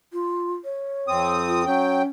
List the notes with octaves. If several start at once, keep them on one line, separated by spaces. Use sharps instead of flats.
F4
C#5
F2 C4 D#6
F4
F#3 C#4 G5